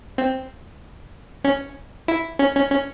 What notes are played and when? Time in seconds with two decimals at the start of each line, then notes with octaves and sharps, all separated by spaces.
0.18 C4
1.44 C#4
2.08 E4
2.39 C#4
2.56 C#4
2.70 C#4